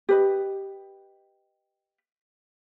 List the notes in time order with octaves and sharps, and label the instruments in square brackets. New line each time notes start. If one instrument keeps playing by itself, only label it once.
[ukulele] G4 B4 D#5